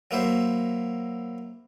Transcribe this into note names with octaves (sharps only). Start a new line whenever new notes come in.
F#3 A#3 E4 C5